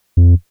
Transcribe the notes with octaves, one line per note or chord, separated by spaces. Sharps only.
F2